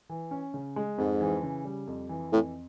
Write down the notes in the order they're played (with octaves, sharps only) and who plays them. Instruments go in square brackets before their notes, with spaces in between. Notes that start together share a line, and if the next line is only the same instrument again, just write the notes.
[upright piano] E3
C#4
C#3
G#3
[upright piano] F2 [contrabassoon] G#2
[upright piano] E3
C#3
G3
F2
E3
[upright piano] F2 [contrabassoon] A2